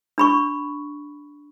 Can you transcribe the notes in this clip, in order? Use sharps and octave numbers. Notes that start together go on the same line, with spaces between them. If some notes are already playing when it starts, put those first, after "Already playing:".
D4 B5 C#6